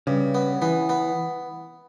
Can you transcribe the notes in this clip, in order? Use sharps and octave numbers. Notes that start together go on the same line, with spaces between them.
G2 C#3
B3
E3 B3
B3